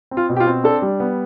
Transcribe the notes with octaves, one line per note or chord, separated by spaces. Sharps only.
C4
F4
B2
G4
F4
C4
D4 A4
G3
B3